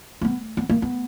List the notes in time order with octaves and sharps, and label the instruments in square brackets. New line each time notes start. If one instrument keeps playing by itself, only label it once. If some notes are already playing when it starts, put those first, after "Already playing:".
[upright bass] A#3
B3
B3
A#3
B3